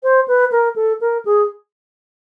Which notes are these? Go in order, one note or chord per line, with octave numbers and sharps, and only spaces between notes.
C5
B4
A#4
A4
A#4
G#4